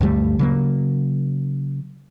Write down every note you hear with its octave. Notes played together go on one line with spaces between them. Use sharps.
D2 G2 G3 A3
C#3 F#3 A#3